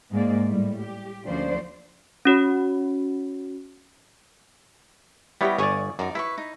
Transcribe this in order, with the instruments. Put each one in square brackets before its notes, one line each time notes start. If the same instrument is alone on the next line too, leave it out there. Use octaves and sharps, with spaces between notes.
[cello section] G#2 G#3 A#3 D5
A2 G3
G4
D2 F3 A#3 C#4 C5 D5
[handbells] C#4 F#4 C#5
[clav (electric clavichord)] G3 B3 C#5 [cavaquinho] E4 G4 D#5
[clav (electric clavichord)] G1 C#5 D5 [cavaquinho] G#5 C#6 D#6
[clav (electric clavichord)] F#2 [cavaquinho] D#4 A#4 D5
[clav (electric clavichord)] E4 [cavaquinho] B4 C6 C#6
[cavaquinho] D#4